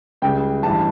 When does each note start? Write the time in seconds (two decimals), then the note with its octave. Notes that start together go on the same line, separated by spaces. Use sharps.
0.22 C#2 C#3 G3 G5
0.63 A1 G2 E3 G3 A5